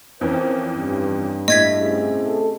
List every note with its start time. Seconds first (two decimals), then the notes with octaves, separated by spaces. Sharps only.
0.21 F2 E3 C#4 A#4 C5
0.77 G2
1.48 A2 D#5 G#6 B6
1.80 C3 C#4 G#4
2.23 A3 A4